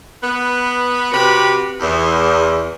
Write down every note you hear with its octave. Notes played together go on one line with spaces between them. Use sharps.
B3 B4
C3 F#4 G4 B4
E2